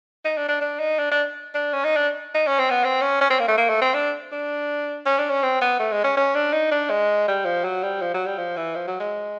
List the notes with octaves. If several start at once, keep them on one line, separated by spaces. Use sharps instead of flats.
D#4
D4
D4
D4
D#4
D4
D4
D4
C#4
D#4
D4
D#4
C#4
C4
B3
C4
C#4
C#4
C4
A#3
A3
A#3
A3
C4
D4
D4
C#4
D4
C#4
C4
B3
A3
G#3
C#4
C#4
D4
D#4
D4
G#3
G3
F3
F#3
G3
F3
F#3
G3
F3
E3
F3
F#3
G#3